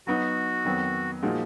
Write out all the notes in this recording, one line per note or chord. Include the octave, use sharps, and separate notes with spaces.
F#3 B3 D#4 F#4
F2 D#3 F#3 B3
A#2 F3 G#3 D#4 F#4